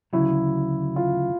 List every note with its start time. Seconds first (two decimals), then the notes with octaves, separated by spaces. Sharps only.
0.13 D2 C#3 F#3 E4
0.96 F4